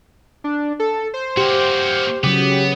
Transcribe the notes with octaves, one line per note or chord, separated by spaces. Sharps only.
D4
A4
C5
A#3 F#4 G4
C#3 F#3 B3 G4